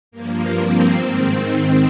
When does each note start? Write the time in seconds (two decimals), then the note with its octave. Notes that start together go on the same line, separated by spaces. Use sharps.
0.12 G2 F3 A#3
0.51 C4
0.93 G#2 D#3